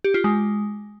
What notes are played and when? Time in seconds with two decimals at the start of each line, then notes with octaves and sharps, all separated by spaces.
0.04 G4
0.14 F4
0.24 G#3